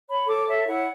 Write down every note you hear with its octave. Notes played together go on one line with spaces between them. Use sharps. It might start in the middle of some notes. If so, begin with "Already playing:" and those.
C#5 B5
A4 D6
C#5 E5
E4 F#5